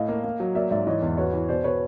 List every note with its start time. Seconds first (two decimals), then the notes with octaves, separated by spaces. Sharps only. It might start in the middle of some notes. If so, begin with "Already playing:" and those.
Already playing: A2 D#5 F5
0.09 A#3
0.24 A#3
0.40 F#3
0.55 A#3 D5 E5
0.71 G#2 D5 E5
0.86 E3 C#5 D#5
1.02 E2
1.17 F#4 B4 C#5
1.33 E3
1.48 B2 C5 D5
1.64 B2 B4 C#5